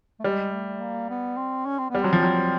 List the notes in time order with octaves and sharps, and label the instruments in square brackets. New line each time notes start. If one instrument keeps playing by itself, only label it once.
[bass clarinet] A3
[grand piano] G3 [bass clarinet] G#3
[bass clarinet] A3
A#3
B3
C4
C#4
C4
[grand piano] G3 [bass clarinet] B3
[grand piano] F#3 [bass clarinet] C4
[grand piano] F3
F#3